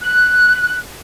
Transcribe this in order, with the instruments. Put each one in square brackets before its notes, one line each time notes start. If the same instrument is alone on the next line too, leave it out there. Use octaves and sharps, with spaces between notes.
[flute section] F#6